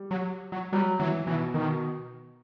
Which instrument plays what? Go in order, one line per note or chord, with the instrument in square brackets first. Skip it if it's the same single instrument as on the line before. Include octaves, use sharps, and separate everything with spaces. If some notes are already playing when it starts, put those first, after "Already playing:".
Already playing: [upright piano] G3
[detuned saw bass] F#3
F#3
[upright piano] F#3 [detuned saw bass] G3
[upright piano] E3 [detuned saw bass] F#3
[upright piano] B2 [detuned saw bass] E3
[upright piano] B2 [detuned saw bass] D#3